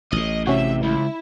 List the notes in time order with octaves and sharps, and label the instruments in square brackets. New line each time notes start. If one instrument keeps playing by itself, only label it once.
[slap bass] A1 A2 [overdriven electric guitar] D#5
[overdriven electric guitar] C3 [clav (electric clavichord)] C#4 F#4 [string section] E5
[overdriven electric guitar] C#2 [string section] E4